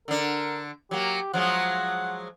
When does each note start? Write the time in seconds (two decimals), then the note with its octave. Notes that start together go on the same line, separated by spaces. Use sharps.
0.08 D3 D4 A#4
0.91 F#3 A#3 G4
1.34 F3 F#3 G#3 F#5